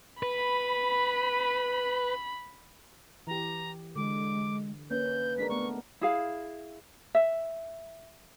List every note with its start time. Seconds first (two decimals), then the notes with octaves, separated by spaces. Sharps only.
0.23 B4 B5
3.27 E3 G4 A#5
3.96 D3 G#3 D6
4.91 A#3 C#4 B4 G6
5.38 G#3 D4 A#4 B6
5.50 A3 B3 C#6
6.01 E4 G#4 F5
7.15 E5